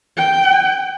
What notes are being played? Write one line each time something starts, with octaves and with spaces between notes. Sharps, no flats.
G5